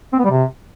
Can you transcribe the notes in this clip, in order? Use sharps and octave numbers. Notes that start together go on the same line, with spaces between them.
C4
B3
G3
C3